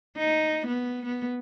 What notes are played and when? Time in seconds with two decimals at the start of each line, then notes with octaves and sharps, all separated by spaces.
0.18 D#4
0.67 B3
1.06 B3